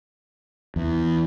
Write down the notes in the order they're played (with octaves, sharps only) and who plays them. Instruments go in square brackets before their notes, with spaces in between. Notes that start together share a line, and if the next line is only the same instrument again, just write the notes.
[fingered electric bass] E2